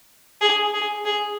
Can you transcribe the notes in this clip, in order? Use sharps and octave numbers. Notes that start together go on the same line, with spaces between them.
G#4
G#4
G#4